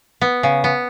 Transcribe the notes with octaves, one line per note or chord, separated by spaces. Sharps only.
B3
C#3
B3